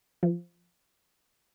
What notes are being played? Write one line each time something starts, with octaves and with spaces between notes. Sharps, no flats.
F3